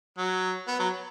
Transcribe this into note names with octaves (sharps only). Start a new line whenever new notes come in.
F#3
B3
F#3